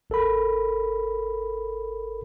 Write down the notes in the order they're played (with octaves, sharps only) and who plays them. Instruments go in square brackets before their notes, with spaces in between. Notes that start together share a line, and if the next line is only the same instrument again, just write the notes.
[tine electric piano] G#1 A4 A#4 B5